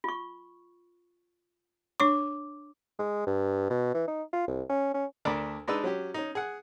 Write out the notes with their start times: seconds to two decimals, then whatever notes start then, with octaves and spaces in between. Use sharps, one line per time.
0.04 F4 C#6
2.00 D4 C#5 C#6 D6
2.99 G#3
3.27 G2
3.70 B2
3.94 E3
4.07 D#4
4.33 F4
4.47 C2
4.69 C#4
4.94 C#4
5.25 D2 D4 A#4 A5 B5 D6
5.68 G#3 D4 D#4 B4 D5 E6
5.84 F#3 C#4 G4
6.14 C#4 D#4
6.35 G#4 F#5